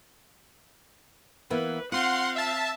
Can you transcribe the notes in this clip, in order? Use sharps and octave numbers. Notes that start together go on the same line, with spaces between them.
E3 A#3 B3 B4
C4 F4 F5 F#5 C6
E5 A5